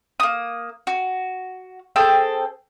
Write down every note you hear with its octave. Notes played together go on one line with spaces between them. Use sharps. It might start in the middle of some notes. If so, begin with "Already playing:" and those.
A#3 D#6
F#4
C4 G#4 A4 G5